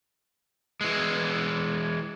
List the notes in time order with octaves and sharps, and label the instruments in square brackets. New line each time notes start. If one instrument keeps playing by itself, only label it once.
[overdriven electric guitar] E3 G#3